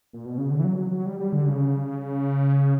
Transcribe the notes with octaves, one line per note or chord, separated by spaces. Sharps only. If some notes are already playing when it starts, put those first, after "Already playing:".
A#2
B2
C#3
D3
E3
F#3
F#3
F#3
G3
G3
D3
C#3